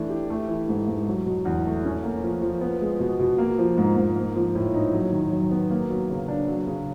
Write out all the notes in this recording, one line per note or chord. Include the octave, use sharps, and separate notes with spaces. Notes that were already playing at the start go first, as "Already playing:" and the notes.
Already playing: E3 A3 D4
G4
A3
E3
G#2
G#2
F#3
B2
E2
A3
C#4
A#3
F3
F3
B3
G#3
B2
B2
A#3
F3
G#2
G#2
A#3
F3
A2
D#4
F#3
D#3
F#2
B3
A#3
F#3
C#3
D4
F#3
C#3